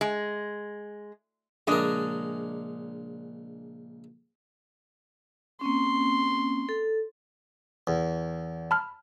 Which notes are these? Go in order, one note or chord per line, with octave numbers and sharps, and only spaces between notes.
G#3
A#1 C#3 G#3 D4 A#4 D#5
A#3 C4 C#4 C6
A4
E2
A5 B5 F6